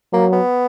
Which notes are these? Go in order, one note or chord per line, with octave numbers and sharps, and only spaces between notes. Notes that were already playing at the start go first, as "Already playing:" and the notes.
F#3 A#3
B3